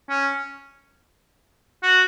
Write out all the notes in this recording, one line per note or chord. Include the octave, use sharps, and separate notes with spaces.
C#4
F#4